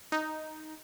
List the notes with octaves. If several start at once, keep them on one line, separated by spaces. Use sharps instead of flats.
D#4